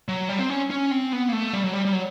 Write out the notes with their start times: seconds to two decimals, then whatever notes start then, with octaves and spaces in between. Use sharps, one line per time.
0.08 F#3
0.29 G3
0.39 C4
0.50 C#4
0.70 C#4
0.91 C4
1.13 B3
1.29 A#3
1.33 A3
1.53 G3
1.64 F#3
1.74 G3
1.85 G3
1.93 F#3